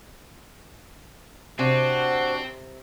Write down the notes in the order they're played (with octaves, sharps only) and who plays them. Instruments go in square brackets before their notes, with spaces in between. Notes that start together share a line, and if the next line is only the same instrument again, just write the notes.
[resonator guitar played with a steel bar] C3 [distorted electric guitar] C4 [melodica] D4 F#4 F#5 [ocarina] C5